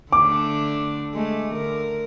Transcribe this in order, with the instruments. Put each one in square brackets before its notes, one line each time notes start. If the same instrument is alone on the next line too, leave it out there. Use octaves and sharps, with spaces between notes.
[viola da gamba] D3 A3 D4 [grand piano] D6
[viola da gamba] G#3 A3
D3 A#4